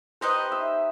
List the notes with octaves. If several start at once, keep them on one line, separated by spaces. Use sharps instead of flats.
D#4 G4 B4 C5 D#5
E5